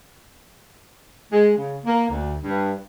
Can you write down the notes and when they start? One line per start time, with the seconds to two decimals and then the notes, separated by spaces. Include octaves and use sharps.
1.31 G#3
1.57 C#3
1.85 A#3
2.09 D2
2.44 G2